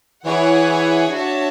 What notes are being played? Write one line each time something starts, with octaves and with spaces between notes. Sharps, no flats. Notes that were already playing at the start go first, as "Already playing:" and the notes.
E3 E4 G#4 C#5 F#5
D4 F#4 C#5 E5 A5